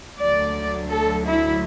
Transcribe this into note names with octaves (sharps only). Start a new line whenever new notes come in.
D2 D3 F#3 D5
A4
E4